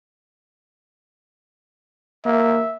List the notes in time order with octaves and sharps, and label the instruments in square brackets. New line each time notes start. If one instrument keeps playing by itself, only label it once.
[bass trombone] A#3 [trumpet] E5